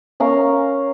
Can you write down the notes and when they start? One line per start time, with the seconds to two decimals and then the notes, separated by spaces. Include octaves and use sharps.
0.20 C#4 A#4 F5